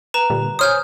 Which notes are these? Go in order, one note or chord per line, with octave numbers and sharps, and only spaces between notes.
B4 A#5 E7
A#2 D3 G3
C5 C#5 G#5 D#6 F6 G6